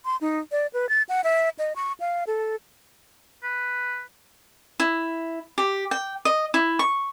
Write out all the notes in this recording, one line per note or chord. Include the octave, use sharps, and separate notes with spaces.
C6
D#4
D5
B4
A6
F#5
E5
D#5
C#6
F5
A4
B4
E4
G4
G5
D#5
E4
C#6